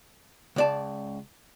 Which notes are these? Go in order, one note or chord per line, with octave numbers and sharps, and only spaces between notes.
C#2 D5 A5